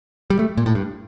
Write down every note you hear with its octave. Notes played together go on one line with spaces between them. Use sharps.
G3
A3
A#2
A2
G2